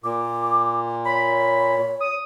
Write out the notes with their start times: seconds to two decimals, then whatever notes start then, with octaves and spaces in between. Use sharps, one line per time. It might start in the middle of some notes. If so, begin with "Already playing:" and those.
0.04 A#2 D6
1.05 C#5 B5
2.01 D#6